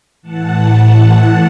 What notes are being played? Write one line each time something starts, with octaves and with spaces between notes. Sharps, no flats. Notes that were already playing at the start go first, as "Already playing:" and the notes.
A2 E3 F#5 A5